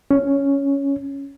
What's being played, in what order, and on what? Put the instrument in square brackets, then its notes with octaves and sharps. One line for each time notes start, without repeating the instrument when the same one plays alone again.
[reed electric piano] C#4